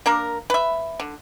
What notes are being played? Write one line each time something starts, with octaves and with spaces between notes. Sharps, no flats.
A#3 D4 A#4
B4 E5
D3